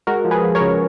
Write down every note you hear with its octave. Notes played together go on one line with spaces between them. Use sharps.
G#3 F#4 A#4
F3
G#4 B4
F3
A#4 C#5
C#3